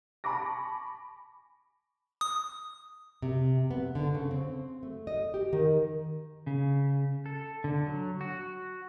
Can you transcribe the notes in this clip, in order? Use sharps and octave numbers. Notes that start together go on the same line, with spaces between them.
G#5 A5 B5 C#6 D6 A#6
D#6
C3
B3
D3
C#3
C4
A3
D#5
G4
D#3
C#3
A4
D3
F#3
F#4